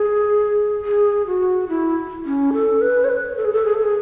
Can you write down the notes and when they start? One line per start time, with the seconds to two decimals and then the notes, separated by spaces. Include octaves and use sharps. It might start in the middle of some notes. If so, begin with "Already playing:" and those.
Already playing: G#4
0.85 G#4
1.27 F#4
1.69 E4
2.25 C#4
2.53 A4
2.81 B4
3.04 C#5
3.09 B4
3.37 A4
3.45 G#4
3.53 A4
3.65 G#4
3.74 A4
3.83 G#4